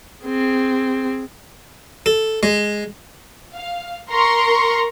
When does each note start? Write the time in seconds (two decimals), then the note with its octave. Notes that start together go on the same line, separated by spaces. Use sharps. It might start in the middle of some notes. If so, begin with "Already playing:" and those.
0.25 C4 G#4
2.06 A4
2.43 G#3
3.53 F5
4.09 A#4 A#5 C6 C#6